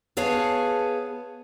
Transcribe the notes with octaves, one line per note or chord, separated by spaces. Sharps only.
B3 G#4 C#5 F5 G#5 A5